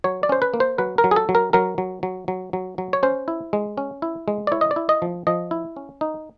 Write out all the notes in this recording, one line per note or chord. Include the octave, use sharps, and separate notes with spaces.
F#3 C#5
D5
C#4 C5
B4
A#3
C5
F#3 B4
A#4
F#3
G#4
A4
F#3
A#4
F#3 A#4
F#3
F#3
F#3
F#3
F#3
C#5
C#4 C5
E4
G#3
C#4
E4
G#3
D5
E4 C#5
D#5
D5
E4
D#5
F3
F3 D#5
E4
C#4
D#4